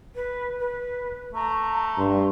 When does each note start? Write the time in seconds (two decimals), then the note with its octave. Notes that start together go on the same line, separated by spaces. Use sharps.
0.15 B4
0.58 B4
1.34 A3 A#5
1.98 G2 C6